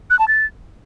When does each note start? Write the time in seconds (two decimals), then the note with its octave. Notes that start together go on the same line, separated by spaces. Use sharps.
0.10 F#6
0.19 A5
0.28 A6